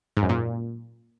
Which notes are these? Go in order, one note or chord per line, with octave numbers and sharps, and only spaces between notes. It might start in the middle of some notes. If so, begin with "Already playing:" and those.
G#2
F#2
A#2